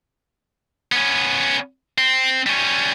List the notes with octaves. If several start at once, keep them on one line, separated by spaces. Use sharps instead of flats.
B3 C#4
C4
G3 C#4